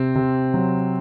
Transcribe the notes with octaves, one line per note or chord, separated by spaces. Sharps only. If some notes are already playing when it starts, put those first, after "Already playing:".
Already playing: C3 C4
C3
F#3